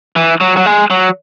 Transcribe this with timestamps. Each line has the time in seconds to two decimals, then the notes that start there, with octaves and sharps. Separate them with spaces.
0.16 E3
0.41 F#3
0.57 F#3
0.66 G#3
0.90 F#3